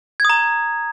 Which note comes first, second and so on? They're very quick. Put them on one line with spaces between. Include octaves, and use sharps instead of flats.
G#6 D#6 A#5